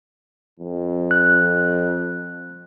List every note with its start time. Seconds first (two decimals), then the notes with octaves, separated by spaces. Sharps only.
0.60 F2
1.11 F#6